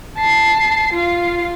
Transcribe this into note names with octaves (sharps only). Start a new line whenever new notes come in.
A5 C7
F4 F5